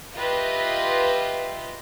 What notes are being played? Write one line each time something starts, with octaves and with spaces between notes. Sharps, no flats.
F4 G4 B4 D#5 E5